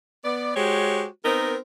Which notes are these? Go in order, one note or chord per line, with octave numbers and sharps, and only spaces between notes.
B3 D5
G#3 F#4 G4 C5 C#5
B3 C4 D#4 A#4